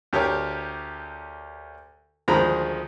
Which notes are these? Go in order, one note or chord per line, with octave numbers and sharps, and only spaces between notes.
D2 G4 A#4 C#5
D2 D#3 F3 G#3 A#5 B5